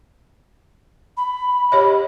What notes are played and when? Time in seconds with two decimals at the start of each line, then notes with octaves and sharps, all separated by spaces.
1.17 B5
1.72 G4 C#5 D#5